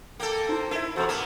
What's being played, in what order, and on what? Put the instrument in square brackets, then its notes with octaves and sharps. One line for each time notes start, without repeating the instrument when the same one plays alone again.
[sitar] A#3 A4 [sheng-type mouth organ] G5
[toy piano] D#4 E4 [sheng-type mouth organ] C5
[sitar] E4 [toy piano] A#4 E5
[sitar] E2 C3 [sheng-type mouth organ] F#4 A4 C5
[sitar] A#3 B3 [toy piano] A#5 [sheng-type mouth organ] F6